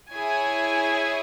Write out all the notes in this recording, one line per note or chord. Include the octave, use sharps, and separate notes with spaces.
E4 G#4 C#5 G#5